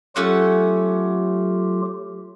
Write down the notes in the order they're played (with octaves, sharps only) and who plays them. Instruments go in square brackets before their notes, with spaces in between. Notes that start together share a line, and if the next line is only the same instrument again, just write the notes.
[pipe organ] F#3 F4 G4 [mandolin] A3 C#4 F#5